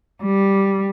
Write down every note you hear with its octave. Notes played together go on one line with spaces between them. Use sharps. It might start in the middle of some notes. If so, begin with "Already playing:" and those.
G3